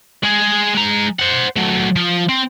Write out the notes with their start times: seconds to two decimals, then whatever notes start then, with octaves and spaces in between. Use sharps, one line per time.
0.23 G#3 G#4
0.75 G#3 A#5
1.19 C5 F#5
1.56 F#3 A3
1.96 F3
2.29 C4